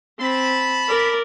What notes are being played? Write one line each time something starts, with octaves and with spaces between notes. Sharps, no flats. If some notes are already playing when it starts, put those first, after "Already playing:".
C4 A5 B5
A#4 D5